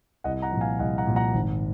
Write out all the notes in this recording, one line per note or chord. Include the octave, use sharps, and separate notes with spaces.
C2 D#5 F#5
F#5 A#5
A#2 F3
F5 G#5
C2 D#5 F#5
F#5 A#5
A#2 F3
F#5 A#5
G#1